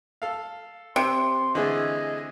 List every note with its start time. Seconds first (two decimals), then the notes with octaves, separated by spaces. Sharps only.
0.22 A4 F5
0.96 C3 C6
1.55 D3 E3 A3 G#4 D#5